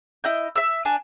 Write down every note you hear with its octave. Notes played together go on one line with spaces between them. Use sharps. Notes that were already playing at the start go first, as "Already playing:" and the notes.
E4 D#5 G6
E5 E6
D4 G#5